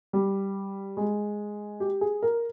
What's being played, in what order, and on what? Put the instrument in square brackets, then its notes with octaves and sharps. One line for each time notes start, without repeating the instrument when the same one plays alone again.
[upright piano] G3
G#3
G4
G#4
A#4